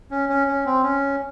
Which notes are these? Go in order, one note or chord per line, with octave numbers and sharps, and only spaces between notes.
C#4
C#4
C#4
C4
C#4